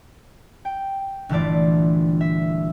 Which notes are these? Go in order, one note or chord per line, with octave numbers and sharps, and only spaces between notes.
G5
G1 A#2 E3 A3 F4 D5
E5